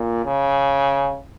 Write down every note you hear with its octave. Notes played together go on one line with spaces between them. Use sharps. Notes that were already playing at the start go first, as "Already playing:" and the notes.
Already playing: A#2
C#3